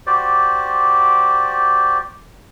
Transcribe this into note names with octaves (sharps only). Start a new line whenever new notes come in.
F#4 G4 C5 D5